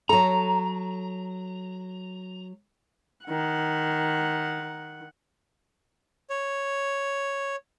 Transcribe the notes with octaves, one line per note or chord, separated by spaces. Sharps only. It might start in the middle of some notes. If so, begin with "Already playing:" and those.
F#3 A4 A#5
D#3 F#5
C#5